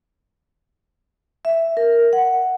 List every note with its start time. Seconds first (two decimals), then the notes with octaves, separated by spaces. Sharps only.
1.45 E5
1.77 A#4
2.13 F#5